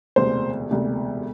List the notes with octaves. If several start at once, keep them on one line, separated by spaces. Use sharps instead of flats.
E1 D2 C3 C5
E1 D2 C3